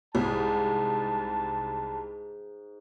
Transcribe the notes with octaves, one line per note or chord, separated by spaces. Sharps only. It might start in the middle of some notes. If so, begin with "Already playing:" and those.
C2 G#2 A5